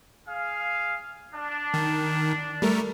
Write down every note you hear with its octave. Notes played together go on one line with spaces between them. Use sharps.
G#4 F5
D4
D#3
G3 A3 A#4